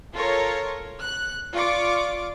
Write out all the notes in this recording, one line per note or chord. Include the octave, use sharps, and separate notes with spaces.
F4 A4 A#4 C#5
F#6
F4 D5 C#6 D6